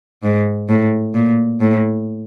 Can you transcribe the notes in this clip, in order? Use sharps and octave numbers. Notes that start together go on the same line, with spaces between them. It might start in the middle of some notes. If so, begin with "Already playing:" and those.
G#2
A2
A#2
A2